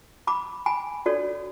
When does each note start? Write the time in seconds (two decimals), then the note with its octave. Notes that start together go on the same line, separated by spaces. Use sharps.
0.27 B5 D6
0.66 G#5 B5
1.06 D4 F#4 A4 C#5 D5